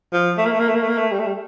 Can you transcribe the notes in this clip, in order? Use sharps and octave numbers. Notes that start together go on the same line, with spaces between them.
F3
A3
A#3
A3
A#3
A3
A#3
A3
A#3
A3
G3
A3
G3